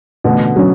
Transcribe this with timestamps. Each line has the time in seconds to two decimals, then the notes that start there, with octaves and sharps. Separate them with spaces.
0.24 A1 B2 D3
0.56 F#3 C#4